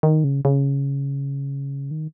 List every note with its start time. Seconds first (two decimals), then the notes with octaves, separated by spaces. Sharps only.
0.03 D#3
0.24 C#3
0.45 C#3
1.91 D#3